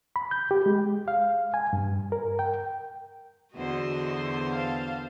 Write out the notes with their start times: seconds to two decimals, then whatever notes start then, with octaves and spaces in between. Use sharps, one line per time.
0.16 B5
0.31 G6
0.51 G4
0.66 G#3
1.08 F5
1.54 G#5
1.73 G2
2.12 A#4
2.39 G5
3.55 E2 D3 F#4 C5 D#5
4.52 F5 A5